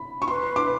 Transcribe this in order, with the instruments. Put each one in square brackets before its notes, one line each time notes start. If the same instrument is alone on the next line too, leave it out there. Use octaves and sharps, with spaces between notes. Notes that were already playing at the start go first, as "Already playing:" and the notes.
Already playing: [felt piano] B5
C#6
[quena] B4 [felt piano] C6
[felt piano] D6